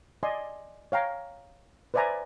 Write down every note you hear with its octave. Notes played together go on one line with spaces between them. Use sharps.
D5 D#5 G#5 C6
C#5 F5 G5 A#5
B4 C5 D5 E5 G#5 A#5